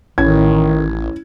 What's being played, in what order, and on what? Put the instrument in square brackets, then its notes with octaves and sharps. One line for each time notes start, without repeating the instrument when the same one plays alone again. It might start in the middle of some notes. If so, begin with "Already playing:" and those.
[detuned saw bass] A1 [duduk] D#3 [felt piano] C#4 E4 G#6